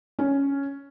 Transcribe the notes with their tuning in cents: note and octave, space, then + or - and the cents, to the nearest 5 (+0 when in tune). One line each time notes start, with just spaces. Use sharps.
C#4 +5